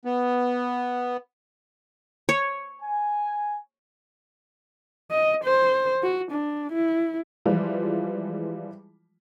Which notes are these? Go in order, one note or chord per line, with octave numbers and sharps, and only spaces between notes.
B3
C#5
G#5
D#5
C5
F#4
D4
E4
E3 F3 G3 G#3 F4